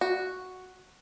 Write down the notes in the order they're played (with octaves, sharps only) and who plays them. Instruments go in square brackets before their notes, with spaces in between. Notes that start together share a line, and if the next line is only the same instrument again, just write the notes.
[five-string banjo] F#4